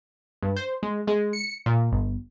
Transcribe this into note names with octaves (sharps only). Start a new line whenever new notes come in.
G2
C5
G#3
G#3
C#7
A#2
G1